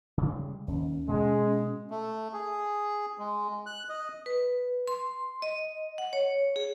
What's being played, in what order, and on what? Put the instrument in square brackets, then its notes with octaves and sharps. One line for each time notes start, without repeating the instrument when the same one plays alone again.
[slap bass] C#3 G3 G#3
[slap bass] D#2 [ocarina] C#4
[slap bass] B2 [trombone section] G#3
[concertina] A3
G#4
G#3
F#6
D#5
[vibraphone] B4
C6
D#5
F#5
C#5
G#4